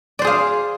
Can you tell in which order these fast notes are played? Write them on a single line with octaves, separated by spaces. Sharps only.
D5 C5 G#4 F5